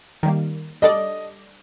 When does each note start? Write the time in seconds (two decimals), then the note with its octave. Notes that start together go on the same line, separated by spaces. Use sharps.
0.23 D#3 G3 A#3
0.82 G3 D4 A4 D5 D#5